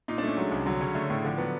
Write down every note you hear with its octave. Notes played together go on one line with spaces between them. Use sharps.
A#2 D#4
D4
A3 C#4
F#3 G#3
C2
D3 F#3
C#3 C#4
D3 A3
A2 C#3
D3 F3
F#3 B3